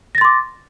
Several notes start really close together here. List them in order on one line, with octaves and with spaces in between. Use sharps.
A#6 A6 C6 D6